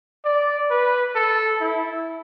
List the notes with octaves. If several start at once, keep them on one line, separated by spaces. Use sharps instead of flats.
D5
B4
A4
E4